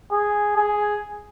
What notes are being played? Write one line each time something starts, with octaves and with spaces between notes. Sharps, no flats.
G#4
G#4